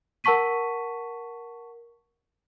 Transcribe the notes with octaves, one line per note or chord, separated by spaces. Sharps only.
A#4 F#5 A5 C#6 B6 D#7